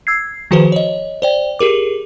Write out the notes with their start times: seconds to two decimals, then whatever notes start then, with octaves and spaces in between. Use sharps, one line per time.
0.07 E6 G#6 C7
0.51 D#3 F3 F#4 G#4 B4 C5
0.72 C#5 D#5
1.22 C5 D5 G5
1.59 G4 G#4 A#4 D6